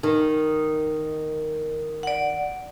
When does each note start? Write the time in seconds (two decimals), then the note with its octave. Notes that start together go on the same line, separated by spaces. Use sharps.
0.03 D#3
2.03 D5 F#5